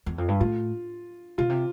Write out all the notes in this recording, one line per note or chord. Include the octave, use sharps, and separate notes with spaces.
E2
F2
G2
A2 F4
B2 F4
C3